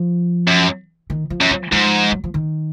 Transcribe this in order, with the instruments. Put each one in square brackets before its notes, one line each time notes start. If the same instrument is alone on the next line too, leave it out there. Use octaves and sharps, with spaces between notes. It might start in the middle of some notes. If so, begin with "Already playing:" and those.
Already playing: [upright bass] F3
[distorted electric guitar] F#2
[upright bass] D#3
F3
[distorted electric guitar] F#2
[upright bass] F3
[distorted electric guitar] G#2 [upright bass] F3
[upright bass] F#3
F3
D#3